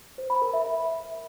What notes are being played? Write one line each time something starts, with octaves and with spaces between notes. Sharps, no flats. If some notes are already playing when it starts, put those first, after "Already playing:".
C5
B5
A#4
E5